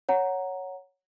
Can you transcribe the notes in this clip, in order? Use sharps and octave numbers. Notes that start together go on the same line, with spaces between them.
C#5 F#5 A#5